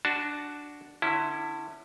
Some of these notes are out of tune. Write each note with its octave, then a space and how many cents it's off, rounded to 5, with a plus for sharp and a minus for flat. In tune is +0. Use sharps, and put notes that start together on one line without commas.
D4 +0 F#4 +0 A5 -10
D3 +25 C#4 +0 E4 +0